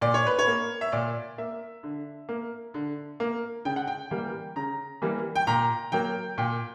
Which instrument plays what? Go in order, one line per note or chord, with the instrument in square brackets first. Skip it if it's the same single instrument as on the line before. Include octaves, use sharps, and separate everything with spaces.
[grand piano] A#2 D5
C#5
B4
C#5
A#3
E5
A#2 D5
A#3 E5
D3
A#3
D3
A#3
C#3 G5
F#5
G5
E3 G3 A#3
C#3 A#5
E3 G3 A#3
G5
A#2 A#5
F#3 A#3 G5
A#2 G5